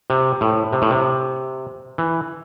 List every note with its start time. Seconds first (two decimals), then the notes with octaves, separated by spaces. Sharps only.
0.10 C3
0.41 A2
0.73 C3
0.82 A2
0.91 C3
1.98 E3